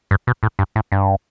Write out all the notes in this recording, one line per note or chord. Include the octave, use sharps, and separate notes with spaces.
G2
B2
A2
G2
A2
G2